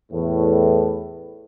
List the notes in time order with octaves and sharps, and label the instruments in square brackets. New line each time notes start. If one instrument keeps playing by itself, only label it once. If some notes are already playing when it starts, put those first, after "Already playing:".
[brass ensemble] E2 A2